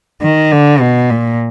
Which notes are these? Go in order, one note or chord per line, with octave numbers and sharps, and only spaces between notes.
D#3
D3
B2
A#2